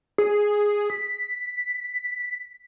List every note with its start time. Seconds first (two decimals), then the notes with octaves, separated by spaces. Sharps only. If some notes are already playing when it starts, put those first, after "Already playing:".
0.18 G#4
0.90 B6